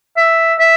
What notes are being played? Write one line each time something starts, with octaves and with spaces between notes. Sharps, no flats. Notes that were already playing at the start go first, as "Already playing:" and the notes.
E5
E5